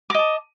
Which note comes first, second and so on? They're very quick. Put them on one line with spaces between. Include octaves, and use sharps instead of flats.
D6 D#5 A5